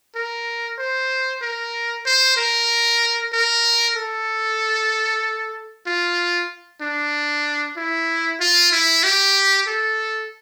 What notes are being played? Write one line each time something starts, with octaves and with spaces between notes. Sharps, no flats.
A#4
C5
A#4
C5
A#4
A#4
A4
F4
D4
E4
F4
E4
G4
A4